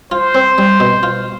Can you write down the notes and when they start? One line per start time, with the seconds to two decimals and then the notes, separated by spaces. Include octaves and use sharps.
0.12 F4 C5
0.35 C4
0.58 G3
0.80 B2
1.03 F4